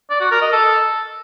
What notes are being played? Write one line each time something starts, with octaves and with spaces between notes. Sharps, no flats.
D5
F#4
A#4
D#5
A4